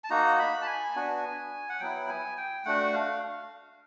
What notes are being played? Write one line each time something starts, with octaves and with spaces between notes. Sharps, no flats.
A5
A#3 D#4 F#4 A#5
B5
A5
G#5
B3 D4 F#4
F#5
F#3 B3 E4 G5
G#5
G5
A3 D4 F#4 F#5
F5